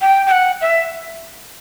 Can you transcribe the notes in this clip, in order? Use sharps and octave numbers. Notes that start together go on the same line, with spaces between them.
G5
G5
F#5
E5